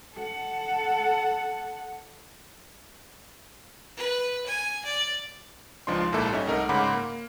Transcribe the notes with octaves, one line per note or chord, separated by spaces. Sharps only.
A4 F#5
B4
G#5
D5
C#2 F3 D4 D#4 C6
A#1 G#2 A#3 E4 A4
G3 C#4 D#4 E5
C2 A3 D#4 A#4
G#2 C#3 F#5 B5 C6 D6
A#3